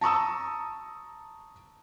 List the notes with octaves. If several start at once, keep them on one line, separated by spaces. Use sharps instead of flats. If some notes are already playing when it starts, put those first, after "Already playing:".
A5 A#5 C#6 D#6 E6